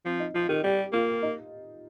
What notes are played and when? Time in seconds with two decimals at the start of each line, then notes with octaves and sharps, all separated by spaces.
0.05 F3 C4
0.20 D#4
0.34 F3 F4
0.49 D#3 G4
0.64 G3 G4
0.93 A#3 F4
1.23 D#4